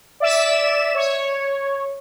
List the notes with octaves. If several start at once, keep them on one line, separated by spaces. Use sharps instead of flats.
D5 E5 E7
C#5